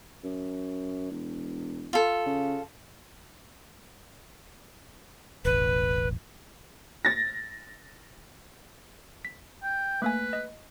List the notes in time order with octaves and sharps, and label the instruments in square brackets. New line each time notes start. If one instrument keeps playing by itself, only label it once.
[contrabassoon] F#2
E1
[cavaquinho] F4 A4
[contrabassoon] C#3
[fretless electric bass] E1 A1 [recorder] B4
[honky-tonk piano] A6 A#6
[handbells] B6
[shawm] G5
[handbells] A3 A#3 G#5 [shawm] B4
[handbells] D#5